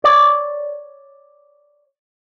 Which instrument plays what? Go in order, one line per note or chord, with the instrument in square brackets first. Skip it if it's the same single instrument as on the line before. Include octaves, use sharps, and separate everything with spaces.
[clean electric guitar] C#5 D5